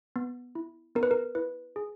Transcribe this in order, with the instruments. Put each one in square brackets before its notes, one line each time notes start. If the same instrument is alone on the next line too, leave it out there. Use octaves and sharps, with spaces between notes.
[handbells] B3
E4
B3 A#4
B4
A#4
E4 B4
G#4